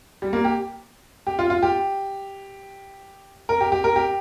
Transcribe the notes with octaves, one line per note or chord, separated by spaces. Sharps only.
G3
A#3
G4
G4
F4
F4
G4
A#4
G4
G4
A#4
G4